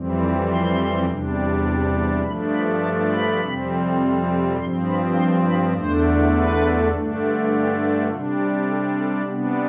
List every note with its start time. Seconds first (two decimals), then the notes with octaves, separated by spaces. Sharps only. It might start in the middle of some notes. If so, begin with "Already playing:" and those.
Already playing: F2 E3 G3 C4
0.46 C6
1.05 E2 C3 G3 D4
2.23 G2 F3 A3 D4 B5
2.52 B5
2.81 A5
3.10 B5
3.40 F2 C3 G3 C4
4.57 G2 F3 C4 C6
4.86 B5
5.15 C6
5.45 B5
5.74 E2 D3 A3 D4 C5
6.33 B4
6.92 G2 D3 A3 D4
7.50 G4
8.09 C3 G3 D4 F4
8.38 G4
8.67 A4
8.97 A4
9.25 C3 G3 B3 D4 G4